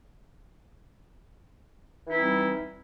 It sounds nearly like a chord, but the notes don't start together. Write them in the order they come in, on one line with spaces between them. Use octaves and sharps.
E3 D#4 E4 C4 G3